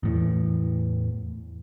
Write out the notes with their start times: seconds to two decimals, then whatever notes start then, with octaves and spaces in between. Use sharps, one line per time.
0.03 E2 A2 E3